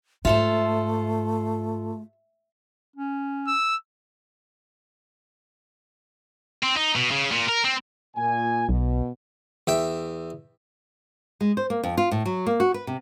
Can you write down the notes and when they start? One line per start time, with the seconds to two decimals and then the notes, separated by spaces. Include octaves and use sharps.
0.25 G#2 A3 F4 A4 C5 E5
2.96 C#4
3.48 E6
6.63 C4
6.77 D#4
6.96 B2
7.11 C#3
7.31 A#2
7.48 A#4
7.64 C4
8.16 A#2 G#5
8.69 B1 B2
9.67 E2 E5 G5
11.41 G#3
11.57 C5
11.70 A#3
11.83 F2
11.97 F4
12.11 A2
12.25 F#3
12.46 A#3
12.60 F#4
12.74 B4
12.87 C3